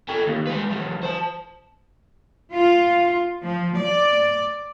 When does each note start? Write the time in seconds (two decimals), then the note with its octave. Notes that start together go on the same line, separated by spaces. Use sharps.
0.08 A4 G5
0.26 D#2
0.47 G#3 B4
0.70 F3 G3
1.03 C5 A5
2.53 F4
3.42 F3
3.77 D5